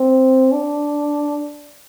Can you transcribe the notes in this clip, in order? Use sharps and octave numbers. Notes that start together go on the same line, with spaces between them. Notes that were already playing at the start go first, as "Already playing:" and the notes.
Already playing: C4
D4